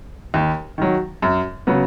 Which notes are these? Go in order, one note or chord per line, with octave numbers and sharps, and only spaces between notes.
D#2
D#3 F#3
F#2
C#3 F#3 B3